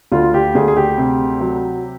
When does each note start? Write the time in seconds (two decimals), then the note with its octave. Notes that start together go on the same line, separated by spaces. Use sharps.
0.12 D2 F4
0.34 G4
0.55 D2 G#4
0.68 G#4
0.77 G4
0.97 C3
1.41 F#3